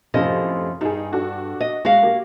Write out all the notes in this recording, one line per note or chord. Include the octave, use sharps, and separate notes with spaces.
F#2 A2 C3 F3 D#5
G2 D#4 G#4
D4 F#4 A4
D#5
G#3 F#4 F5 A#6 F#7
A#3 G4